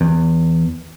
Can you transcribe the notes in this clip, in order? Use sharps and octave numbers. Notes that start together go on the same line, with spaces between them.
E2